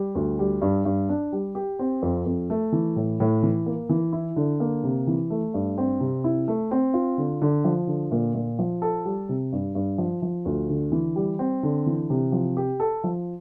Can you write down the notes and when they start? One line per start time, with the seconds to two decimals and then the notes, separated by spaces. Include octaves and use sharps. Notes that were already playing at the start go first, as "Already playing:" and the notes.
Already playing: G3
0.15 D2
0.39 G3
0.62 G2
0.85 G2
1.09 D4
1.32 G3
1.55 G4
1.79 C4
2.02 F2
2.26 F2
2.50 A3
2.72 E3
2.96 A2
3.20 A2
3.43 E3
3.66 A#3
3.89 E3
4.13 E4
4.36 D3
4.60 A#3
4.83 C3
5.07 E3
5.30 A3
5.54 G2
5.78 C4
6.00 C3
6.24 E4
6.48 A3
6.71 C4
6.94 F4
7.18 D3
7.42 D3
7.64 F3
7.87 D3
8.11 A#2
8.34 A#2
8.59 F3
8.82 A4
9.05 G3
9.29 C3
9.52 G2
9.75 G2
9.98 F3
10.22 F3
10.45 D2
10.69 D3
10.92 E3
11.16 G3
11.39 C4
11.63 D3
11.86 E3
12.10 C3
12.32 F3
12.57 G4
12.80 A4
13.04 F3